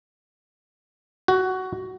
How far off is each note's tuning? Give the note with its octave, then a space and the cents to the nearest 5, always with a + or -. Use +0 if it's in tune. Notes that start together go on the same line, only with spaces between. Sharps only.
F#4 +15